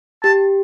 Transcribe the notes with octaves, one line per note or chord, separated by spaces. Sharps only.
G4 A5